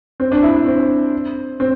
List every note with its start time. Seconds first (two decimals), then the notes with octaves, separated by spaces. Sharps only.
0.20 C4
0.32 D4
0.43 E4
0.55 D4
0.66 C4
1.60 C4